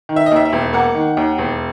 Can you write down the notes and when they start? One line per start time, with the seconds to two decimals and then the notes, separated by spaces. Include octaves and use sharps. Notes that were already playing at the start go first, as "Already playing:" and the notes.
0.09 D#3
0.16 E5
0.26 D#5
0.32 D#2 E5
0.45 E5
0.53 E1
0.73 A#3 F#5
0.95 D#3
1.17 D#2
1.38 E1